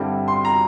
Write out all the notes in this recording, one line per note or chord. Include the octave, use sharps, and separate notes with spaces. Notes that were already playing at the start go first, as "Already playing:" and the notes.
Already playing: G2 D3 G3 C4 E4
C6
A#5